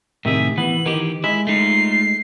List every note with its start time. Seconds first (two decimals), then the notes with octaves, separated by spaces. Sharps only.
0.25 A2 C3 D#3 G#4 E5
0.58 E3 B3 F#7
0.86 D#3 E3 G4
1.24 G#3 E4 B6
1.47 A3 D#4 F4 C7